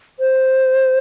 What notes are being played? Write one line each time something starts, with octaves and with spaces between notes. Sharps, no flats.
C5